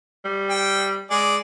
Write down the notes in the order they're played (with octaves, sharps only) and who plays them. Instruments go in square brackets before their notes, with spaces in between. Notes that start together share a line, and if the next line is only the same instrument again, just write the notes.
[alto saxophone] G3
[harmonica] G5
[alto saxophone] G#3 [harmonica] G#4 D5